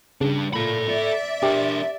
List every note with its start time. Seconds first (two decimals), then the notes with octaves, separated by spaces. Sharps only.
0.21 C#3 G3 D4
0.53 A#2 A4 B5
0.91 D5 E5
1.43 D4 G4 A#4